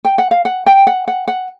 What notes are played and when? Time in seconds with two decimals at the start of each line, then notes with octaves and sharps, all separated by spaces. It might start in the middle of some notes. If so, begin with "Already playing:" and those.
0.05 G5
0.18 F#5
0.31 F5
0.45 F#5
0.66 G5
0.87 F#5
1.08 F#5
1.28 F#5